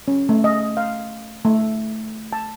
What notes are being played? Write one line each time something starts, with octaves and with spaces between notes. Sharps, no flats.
C#4
A3
D#5
F5
A3
A5